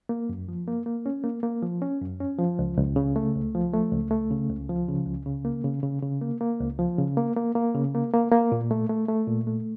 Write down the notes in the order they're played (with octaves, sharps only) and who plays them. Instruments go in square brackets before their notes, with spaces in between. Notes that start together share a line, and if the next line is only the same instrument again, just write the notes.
[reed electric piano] A#3
F#2
F3
A#3
A#3
C#4
A#3
A#3
F3
C#4
F#2
C#4
F3
C#2
C#2
C#3
A3
C#2
F3
A3
C#2
A3
C#3
C#2
F3
C#3
C#2
C#3
A#3
C#3
C#3
C#3
A#3
A#3
C#2
F3
C#3
A#3
A#3
A#3
C#3
A#3
A#3
A#3
A#2
A3
A3
A3
A#2
A3